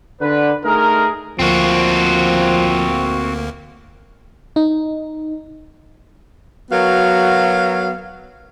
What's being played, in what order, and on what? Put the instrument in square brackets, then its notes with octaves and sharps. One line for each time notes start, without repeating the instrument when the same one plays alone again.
[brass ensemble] D3 B4
A3 D#4 G#4 A#4
[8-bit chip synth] D2 A#3 [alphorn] F3 [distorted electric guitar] C4 F#4
[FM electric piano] D#4
[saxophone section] F#3 B3 F#4 A#4 F5